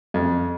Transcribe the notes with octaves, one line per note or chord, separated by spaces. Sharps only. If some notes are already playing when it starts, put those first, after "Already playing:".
F2